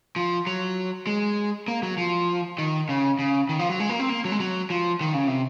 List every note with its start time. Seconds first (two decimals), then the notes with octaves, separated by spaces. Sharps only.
0.16 F3
0.47 F#3
1.07 G#3
1.68 A#3
1.83 F#3
1.98 F3
2.58 D#3
2.89 C#3
3.19 C#3
3.49 D#3
3.59 F3
3.69 F#3
3.80 G#3
3.89 A#3
4.00 C4
4.09 A#3
4.25 F#3
4.32 G#3
4.40 F#3
4.70 F3
5.01 D#3
5.14 C#3
5.27 C3